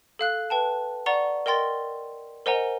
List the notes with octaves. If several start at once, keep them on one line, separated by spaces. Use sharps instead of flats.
A4 F5 F#6
B4 G5 A5
D5 F#5 A#5 C#6 G7
A#4 D#5 G5 C6 A6
A#4 C5 D#5 F#5 G#5 A#5